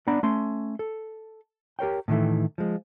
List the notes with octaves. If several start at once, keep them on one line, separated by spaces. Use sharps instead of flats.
B3 D4 D5 F#5 A#5 B5
A3 C#4 C6
A4
G4 A#4 C#5 G5
A2 D#3 E3 A3
F3 G#3